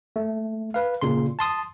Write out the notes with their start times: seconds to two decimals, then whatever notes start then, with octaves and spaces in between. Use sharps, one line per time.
0.16 A3
0.74 B4 F5
1.02 A#2 C#3 C6
1.39 A5 C6 D#6